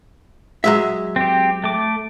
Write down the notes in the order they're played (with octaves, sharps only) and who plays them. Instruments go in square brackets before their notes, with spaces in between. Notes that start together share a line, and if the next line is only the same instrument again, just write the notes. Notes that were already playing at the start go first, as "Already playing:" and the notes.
[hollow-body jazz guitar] F#3 G#3 E5
[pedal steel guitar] C4 G4
A3 D6